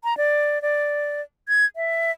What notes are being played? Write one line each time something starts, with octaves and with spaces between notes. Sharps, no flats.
A#5
D5
D5
G#6
E5